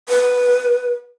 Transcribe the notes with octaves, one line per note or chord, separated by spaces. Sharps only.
B4